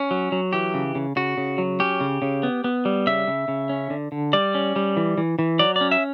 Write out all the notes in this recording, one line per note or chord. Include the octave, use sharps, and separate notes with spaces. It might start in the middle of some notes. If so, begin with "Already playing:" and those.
Already playing: C#4
F#3
F#3
E3 G4
C#3
C#3
C#3 F#4
C#3
F#3
C#4 G4
C#3
C#3
B3
B3
G3
C#3 E5
C#3
C#3
C#4
D3
D3
G3 D5
C#4
G3
E3
E3
E3
F#3 D5
D5
C#4
E5